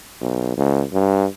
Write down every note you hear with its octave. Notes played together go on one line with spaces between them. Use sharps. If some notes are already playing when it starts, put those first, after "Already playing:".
B1
C#2
G2